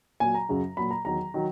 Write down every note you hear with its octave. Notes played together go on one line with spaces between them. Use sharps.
A#2 F#3 G#5
A#5
F#2 C#3 F#3
A#2 F#3 B5
A#5
E2 D#3 F#3 A#5
D#3 F#3